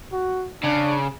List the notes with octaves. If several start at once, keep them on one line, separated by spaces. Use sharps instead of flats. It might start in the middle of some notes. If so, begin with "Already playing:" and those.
F#4
C#3 D4